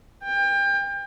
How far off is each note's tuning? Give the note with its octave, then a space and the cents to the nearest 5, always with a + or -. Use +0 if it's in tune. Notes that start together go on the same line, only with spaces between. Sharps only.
G5 +30